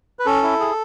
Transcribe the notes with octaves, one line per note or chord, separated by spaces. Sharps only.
B4
C#4 A4
E4
G#4